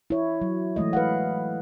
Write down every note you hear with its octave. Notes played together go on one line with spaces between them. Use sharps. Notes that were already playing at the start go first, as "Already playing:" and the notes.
E4 C#5
F#3
E3 G#3 A3 D#5
B4 F5 F#5